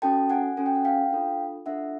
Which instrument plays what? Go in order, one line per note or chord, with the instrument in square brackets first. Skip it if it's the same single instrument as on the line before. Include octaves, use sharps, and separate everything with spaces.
[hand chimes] C#4 F#4 A4 G5 A5
F#5 G#5
C#4 F#4 A4 G#5
G5
F#5
F5 G5
D4 F4 A4
D4 F4 A4 E5 F#5